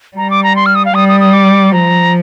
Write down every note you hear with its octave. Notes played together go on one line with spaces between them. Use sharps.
G3 A#5
D6
A#5
C6
F6
D#6
F5
G3 D#6
D#6
D#6
D6
F3 A#5